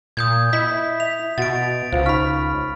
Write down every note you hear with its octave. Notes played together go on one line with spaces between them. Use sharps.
A#2 D#6 G6 G#6
E4 D#5 B6
E5 B6 F7
B2 F#4 F#5 A6 D7
C#2 F4 C5 F5
D#4 B5 C#6 F6 B6